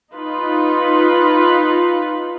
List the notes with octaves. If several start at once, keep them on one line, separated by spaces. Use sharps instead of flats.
D#4 F4 B4